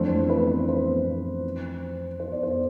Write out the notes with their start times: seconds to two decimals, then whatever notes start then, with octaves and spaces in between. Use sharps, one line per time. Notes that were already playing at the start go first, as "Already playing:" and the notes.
Already playing: F2 E3 A3 D4 C5
0.29 B4
0.68 C5
2.20 C5
2.32 D5
2.43 C5